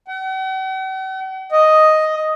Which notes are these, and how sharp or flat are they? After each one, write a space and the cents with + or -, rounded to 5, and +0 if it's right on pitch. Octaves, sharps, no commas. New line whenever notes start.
F#5 +45
D#5 +5